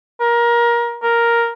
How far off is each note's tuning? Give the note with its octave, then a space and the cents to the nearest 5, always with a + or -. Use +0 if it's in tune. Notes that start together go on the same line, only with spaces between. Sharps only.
A#4 +25
A#4 +5